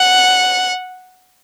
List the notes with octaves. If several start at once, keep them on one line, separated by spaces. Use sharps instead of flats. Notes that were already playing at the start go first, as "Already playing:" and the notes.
Already playing: F#5